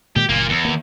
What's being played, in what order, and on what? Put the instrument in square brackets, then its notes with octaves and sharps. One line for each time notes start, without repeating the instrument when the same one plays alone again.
[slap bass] A#2 D#3 G#3 [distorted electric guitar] G4
[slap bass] F#1 A#2 D#3 [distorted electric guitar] A#3 F4
[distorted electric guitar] E2
[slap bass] D#3 A#3